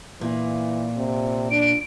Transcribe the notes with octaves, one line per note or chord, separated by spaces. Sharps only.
A#2 E3
C3
D4 D7